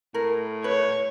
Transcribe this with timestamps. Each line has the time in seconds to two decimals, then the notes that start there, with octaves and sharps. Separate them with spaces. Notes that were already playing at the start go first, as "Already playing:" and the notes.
0.14 A2 A#4
0.64 B4 C#5